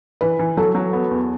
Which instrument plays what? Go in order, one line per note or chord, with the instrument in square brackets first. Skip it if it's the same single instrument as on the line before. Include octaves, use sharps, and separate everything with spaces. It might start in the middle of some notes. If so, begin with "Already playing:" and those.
[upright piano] E3 [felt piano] B4
[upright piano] E3
[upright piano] F#3 [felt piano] A4
[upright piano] F#3
B3
E2